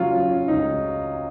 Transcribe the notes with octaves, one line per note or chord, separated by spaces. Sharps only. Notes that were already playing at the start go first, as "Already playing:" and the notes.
Already playing: C#3 F#3 C#4 F4
C#4
C#4
C#2 D#4